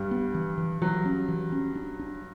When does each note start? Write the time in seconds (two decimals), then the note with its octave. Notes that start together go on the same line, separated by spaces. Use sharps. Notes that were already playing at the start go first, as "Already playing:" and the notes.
Already playing: G2 G3
0.11 B3
0.34 E3
0.58 E3
0.81 E3 F#3
1.05 C#4
1.28 E3
1.52 C#4
1.76 D4
1.99 D4